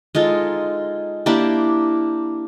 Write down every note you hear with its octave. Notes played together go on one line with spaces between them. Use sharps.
G#3 D#4 F4 A4
A#3 D4 E4 G4